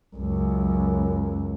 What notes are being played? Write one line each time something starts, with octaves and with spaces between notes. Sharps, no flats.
C#2 F#2